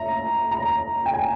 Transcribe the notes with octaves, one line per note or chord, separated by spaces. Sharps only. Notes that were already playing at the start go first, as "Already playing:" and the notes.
Already playing: E5 A#5
A#5
G5
G#5